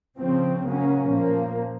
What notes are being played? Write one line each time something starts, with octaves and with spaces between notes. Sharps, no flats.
C#3 F3 C4
C#3 F#3 A#3 C#4
A#2 F3 A#3